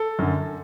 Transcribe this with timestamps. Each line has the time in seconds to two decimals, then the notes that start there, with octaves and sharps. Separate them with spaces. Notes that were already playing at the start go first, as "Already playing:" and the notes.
Already playing: A4
0.19 F#2 D3